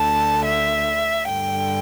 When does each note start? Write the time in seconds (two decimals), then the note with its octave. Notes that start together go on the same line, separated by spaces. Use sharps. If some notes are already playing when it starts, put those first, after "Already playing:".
Already playing: D2 D3 A5
0.45 E5
1.28 G2 D3 G5